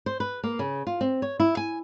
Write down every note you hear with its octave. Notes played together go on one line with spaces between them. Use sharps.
C5
B4
A#3
C#3
F4
C4
C#5
E4
G#5